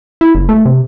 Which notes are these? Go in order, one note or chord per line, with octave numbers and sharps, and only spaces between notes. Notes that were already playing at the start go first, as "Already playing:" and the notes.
E4
F#1
A3
C3